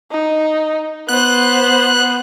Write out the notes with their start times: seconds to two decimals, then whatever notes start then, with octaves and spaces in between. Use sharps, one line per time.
0.11 D#4
1.09 B3 C5 F#6